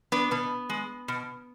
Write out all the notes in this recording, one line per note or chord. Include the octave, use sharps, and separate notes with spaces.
B3 D4
B2 B3
G#3
B2